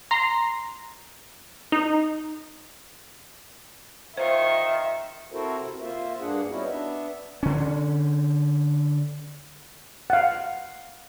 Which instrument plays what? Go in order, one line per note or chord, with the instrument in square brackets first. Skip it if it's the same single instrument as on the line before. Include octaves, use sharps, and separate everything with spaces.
[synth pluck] A#5 C6
D#4
[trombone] D#3 [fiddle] F4 C#6 [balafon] C5 [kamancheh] E5
[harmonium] C4 E4 F#4 A4 A#4 C5
C3
A#3 F4 C5 E5
G2 A#3 D4 G#4 F#5
G3 B3 C#4 D#4 E4 F#4
B3 D4 E5
[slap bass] D3 C#4
[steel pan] F5 F#5